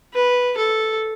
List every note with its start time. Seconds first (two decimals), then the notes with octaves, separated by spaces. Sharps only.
0.14 B4
0.57 A4